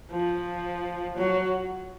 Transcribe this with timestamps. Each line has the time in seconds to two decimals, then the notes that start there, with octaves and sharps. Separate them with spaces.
0.11 F3
1.17 F#3